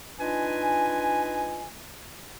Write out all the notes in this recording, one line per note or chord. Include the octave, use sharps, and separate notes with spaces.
D4 D#4 F4 B4 D#5 G#5